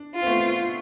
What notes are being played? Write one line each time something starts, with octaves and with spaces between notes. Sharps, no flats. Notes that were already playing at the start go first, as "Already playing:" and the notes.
Already playing: D4
F4
C4
A3 B3